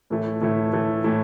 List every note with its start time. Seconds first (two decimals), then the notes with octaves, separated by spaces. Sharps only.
0.10 A2 E3 A3 E4
0.41 A2 E3 A3 E4
0.73 A2 E3 A3 E4
1.04 A2 E3 A3 E4